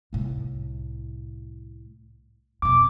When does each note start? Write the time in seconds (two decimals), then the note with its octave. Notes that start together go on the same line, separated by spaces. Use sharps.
0.13 C2 A2
2.62 F2 B2 D6